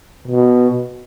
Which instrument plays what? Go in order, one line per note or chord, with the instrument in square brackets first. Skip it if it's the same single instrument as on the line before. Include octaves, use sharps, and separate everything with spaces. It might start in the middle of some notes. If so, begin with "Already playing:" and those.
[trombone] B2